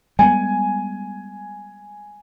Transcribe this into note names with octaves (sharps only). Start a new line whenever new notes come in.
G3 G#3 B3 G#5